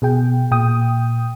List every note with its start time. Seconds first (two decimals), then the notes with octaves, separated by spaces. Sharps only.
0.02 B2 G#4 G5
0.51 A#2 G5 D#6